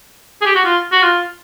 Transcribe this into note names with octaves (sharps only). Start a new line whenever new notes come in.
G#4
G4
F#4
F4
F#4
F4